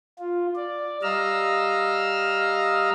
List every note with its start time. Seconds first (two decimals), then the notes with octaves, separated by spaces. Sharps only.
0.19 F4
0.56 D5
1.03 G3 D#5 F5 A#5 E6 F6